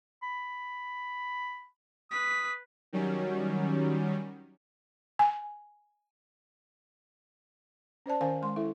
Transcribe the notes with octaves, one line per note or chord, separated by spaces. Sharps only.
B5
B4 D#6 B6
D#3 F#3 G3 C#4
G#5
C#4 C5 D5 A5
D#3 C#4 A#4 C5 F5 G#5
G#3 C6
E4 A4 E5